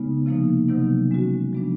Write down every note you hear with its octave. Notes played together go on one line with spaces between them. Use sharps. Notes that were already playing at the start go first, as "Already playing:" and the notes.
Already playing: C#3 G#3 B3 D#4
C3 F3 A#3 D#4
C3 D#3 F#3 B3 D#4
G#3 C#4 F#4
F3 G#3 B3 D4